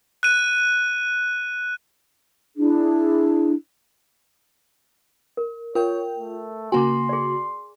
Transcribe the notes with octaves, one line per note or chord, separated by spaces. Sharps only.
F#6 D#7
D4 E4 G#4
A#4
F4 A#4 C#5 G5
A3
C#3 A#3 F#4 G#5 A#5 C6 D6
G#4 D5